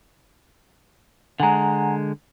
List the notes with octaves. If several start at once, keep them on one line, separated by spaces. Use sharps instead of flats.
D3 G#3 F#5 G#5 A#5